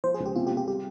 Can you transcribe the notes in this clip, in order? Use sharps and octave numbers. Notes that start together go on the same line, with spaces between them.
F3 C5
G#4
C#2
G4
C3 F4
G4
C3
G4
G3 G4